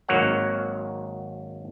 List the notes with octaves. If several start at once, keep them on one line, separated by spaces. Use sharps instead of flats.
G#1 D#3 F#3 A#3 C#5 F#5